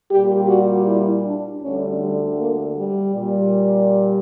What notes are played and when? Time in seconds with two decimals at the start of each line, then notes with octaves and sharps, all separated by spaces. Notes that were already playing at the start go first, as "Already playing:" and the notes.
0.10 A#2 G3 G4
0.48 F#4
0.86 E4
1.25 D4
1.62 D2 D3 G3 C#4
2.00 G3
2.38 A#3
2.76 G3
3.14 A#2 G3